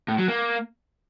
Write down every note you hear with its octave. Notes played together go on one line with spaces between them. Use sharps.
A2
F#3
A#3